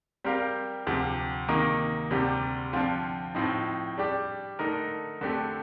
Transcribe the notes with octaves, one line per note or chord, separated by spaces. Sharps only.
G3 C4 G4 A#4 F5
D2 C3 F3 C4 G4
C3 D#3 A#3 D#4 A#4
D2 C3 G3 D4 G4
D3 F3 C4 F4
A2 F3 C4 D#4
G3 D4 G4
D3 A3 D#4 A#4
D3 A3 C4 G4